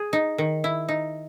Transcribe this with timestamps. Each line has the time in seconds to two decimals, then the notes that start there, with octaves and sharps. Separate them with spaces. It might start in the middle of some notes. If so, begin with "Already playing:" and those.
Already playing: G#4
0.13 D#4
0.38 D#3
0.64 E4
0.89 D#4